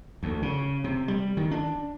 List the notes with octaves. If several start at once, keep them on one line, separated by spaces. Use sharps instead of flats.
D2
C#3
C3
G3
D#3
D4